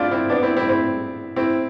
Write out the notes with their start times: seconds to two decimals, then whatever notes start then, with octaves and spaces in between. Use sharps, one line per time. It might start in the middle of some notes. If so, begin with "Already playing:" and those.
Already playing: C4 D4 E4 F4
0.11 C4 E4
0.29 B3 D4
0.43 C4 E4
0.57 C4 E4
0.69 C4 E4
1.36 C4 E4